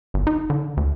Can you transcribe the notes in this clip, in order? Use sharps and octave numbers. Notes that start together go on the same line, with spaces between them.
G1
D#4
D3
D2